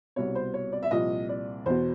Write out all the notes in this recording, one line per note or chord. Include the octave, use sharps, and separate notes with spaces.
C2 B2 C#5
C5
C#5
D5
E5
C2 A#2 F3 D#5
D5
E2 B2 C5